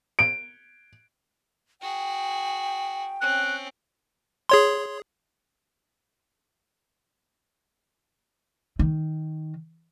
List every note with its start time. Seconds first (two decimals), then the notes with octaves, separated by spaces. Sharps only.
0.19 D7
1.81 F#4 G#4 G5
3.21 C4 C#4 F#6
4.49 G#4 C#5 C6
8.79 D#3